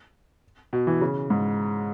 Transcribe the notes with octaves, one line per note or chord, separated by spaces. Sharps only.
B2
E3
C#3
G#2